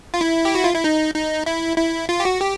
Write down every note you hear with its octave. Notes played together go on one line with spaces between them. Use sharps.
F4
E4
G4
F#4
F4
E4
D#4
D#4
E4
E4
F4
G4
F#4
G4